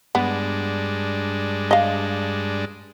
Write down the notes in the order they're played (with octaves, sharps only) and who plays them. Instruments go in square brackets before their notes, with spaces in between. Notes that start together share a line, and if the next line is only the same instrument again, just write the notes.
[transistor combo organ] G2 G#3 D4 [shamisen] B3
[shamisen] D#5 F5